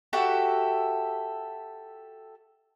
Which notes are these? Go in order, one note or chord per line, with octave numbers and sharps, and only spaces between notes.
F#4 G4 A4 E5